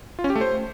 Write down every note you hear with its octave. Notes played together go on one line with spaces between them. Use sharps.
F4
C#4
G4
A3
C5